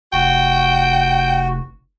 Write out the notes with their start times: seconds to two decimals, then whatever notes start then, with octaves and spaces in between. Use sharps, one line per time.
0.13 F1 F#4 G5